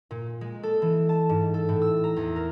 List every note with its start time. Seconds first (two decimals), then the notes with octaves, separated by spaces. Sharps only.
0.11 A#2
0.41 G#3
0.63 A4
0.82 E3
1.09 A5
1.29 G#2
1.54 A4
1.69 A2
1.82 E6
2.04 A#5
2.17 E2
2.36 A#4